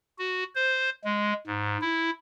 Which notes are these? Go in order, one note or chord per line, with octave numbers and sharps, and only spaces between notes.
F#4
C5
G#3
G#2
E4